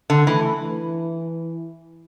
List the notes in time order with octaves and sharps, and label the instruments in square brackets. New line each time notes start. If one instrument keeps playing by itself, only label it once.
[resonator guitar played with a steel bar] D3
[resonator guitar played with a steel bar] E3 [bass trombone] A3
[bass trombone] E3